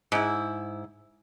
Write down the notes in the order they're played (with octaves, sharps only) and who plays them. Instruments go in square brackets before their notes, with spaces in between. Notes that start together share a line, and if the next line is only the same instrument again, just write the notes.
[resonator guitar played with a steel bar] G#2 E4